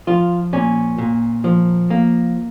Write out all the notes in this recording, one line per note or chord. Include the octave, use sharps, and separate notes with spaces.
F3 F4
A#2 C#4
A#2
F3
A#3